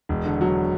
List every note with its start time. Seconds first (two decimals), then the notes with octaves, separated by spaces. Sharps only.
0.09 E1
0.26 D3
0.41 F#3